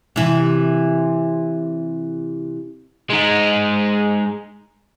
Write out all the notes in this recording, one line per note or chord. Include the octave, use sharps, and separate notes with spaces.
C3 E3
G#3 D#4